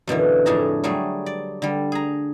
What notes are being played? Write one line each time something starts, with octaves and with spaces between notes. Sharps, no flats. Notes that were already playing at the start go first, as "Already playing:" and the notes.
F#2 B2 D3 E3
F2 A2 D4 G#4 A5 A#5
F#3 G3 A3 G#4
D5
D3 G3
G#4 A#5